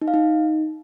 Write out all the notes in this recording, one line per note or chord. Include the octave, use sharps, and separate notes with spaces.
D#4
F5
D#4